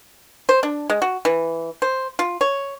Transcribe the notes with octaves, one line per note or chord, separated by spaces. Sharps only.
C5
D4
G#3
F#4
E3
C5
F4
C#5